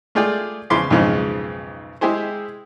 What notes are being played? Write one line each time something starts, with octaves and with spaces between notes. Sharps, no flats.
A3 F4 G#4 D5 G5
E2 C#3 F3 B5 C6 D6
B1 F2 G#2 C#3 F3 G#3
G#3 E4 G4 G#4 C5